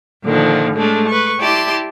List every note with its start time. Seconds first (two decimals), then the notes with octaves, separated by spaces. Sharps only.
0.24 A#2 D3 D#3 F3
0.74 A2 G#3 A3 D4
1.08 B4 C#6
1.40 E4 G4 D5 A5 C6